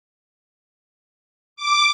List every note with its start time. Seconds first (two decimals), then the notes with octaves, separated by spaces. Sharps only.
1.56 D6